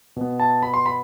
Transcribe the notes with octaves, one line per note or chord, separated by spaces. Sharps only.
B2 B3
A5
B5
C6
B5